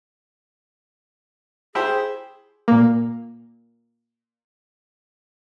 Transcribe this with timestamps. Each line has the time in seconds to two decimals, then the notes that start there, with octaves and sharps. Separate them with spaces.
1.75 E4 G4 G#4 C5
2.68 A#2 A#3